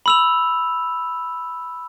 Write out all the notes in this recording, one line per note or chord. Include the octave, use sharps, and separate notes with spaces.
B5 E6 F7